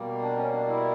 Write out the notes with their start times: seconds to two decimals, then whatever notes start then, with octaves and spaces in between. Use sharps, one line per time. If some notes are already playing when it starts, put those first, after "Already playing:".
Already playing: B2 G3 A#3
0.22 D4
0.36 C#4
0.52 D4
0.68 E4